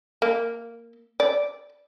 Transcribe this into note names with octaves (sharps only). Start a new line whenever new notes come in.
A#3
D5